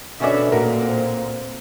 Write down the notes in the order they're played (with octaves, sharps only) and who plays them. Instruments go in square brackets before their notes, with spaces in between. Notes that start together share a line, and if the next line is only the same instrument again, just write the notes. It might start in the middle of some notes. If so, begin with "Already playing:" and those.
[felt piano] B2 C#4 D4 [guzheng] D3 B3 [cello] E5
[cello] A#2 [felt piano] A#3 F#4 A#4
[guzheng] C4